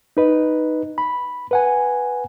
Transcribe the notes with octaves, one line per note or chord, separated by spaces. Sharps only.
D#4 B4 D#5
B5
B4 F#5 G#5